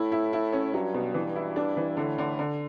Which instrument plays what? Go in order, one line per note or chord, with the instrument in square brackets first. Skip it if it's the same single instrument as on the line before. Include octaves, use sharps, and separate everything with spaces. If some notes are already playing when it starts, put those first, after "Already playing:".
Already playing: [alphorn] A2 [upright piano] E4
[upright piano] E4
E4
C#4
[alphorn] G2 [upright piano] F#3
[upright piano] B2
E3
E4
D4
E3
[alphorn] A2 [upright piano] D3
[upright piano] D3
D3